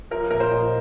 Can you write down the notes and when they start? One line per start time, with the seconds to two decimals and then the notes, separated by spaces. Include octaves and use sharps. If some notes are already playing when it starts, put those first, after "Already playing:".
0.11 F3 A#4
0.30 A#2 A#4
0.40 C5
0.51 A#2 D#5